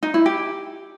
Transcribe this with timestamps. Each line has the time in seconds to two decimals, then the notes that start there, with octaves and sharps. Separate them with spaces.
0.03 D#4
0.14 E4
0.26 G4